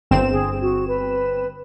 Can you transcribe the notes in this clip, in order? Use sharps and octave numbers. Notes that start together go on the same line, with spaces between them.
G1 C4 E7
G#4
F#4
B4